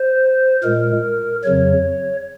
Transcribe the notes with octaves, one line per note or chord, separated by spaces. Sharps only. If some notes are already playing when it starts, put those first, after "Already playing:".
Already playing: C5
A#2 G#3 A#4
F2 C#3 F#3 C#5